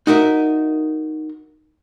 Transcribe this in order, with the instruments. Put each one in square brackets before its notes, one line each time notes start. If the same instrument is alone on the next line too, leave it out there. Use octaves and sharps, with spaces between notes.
[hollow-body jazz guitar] D#4 F#4 A#4 E5